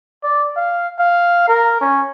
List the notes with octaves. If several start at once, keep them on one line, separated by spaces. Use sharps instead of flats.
D5
F5
F5
A#4
C#4